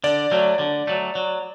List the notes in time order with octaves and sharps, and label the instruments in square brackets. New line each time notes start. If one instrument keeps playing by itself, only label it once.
[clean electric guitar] D3 [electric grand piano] D5
[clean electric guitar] F#3 A3
D3
F#3 A3
F#3